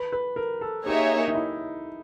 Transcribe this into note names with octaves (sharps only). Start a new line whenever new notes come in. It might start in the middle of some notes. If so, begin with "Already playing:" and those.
Already playing: B4
B4
A#4
A4
A#3 D#4 G4 G#4 C#5 E5
D#4
E4